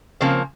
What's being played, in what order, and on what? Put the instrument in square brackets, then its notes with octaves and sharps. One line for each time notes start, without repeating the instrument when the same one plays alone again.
[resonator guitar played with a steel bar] C#3 F3 A#3 C4